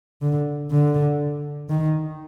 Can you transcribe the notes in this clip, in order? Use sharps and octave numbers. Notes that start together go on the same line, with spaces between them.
D3
D3
D#3